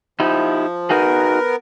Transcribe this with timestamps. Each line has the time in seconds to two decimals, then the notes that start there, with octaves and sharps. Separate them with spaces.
0.20 F3 D#4 E4 G4
0.90 B3 D#4 F#4 G#4 A#4